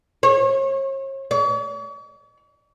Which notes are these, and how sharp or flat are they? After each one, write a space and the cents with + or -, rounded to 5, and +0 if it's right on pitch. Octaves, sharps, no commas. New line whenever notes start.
C#5 -40
C#5 +45